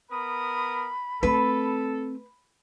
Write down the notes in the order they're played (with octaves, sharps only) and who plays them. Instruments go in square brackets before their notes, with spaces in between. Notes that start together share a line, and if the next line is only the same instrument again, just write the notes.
[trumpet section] B3 A#4 D#6 [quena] B5
[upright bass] A3 C4 [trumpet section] A4 [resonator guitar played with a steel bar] B4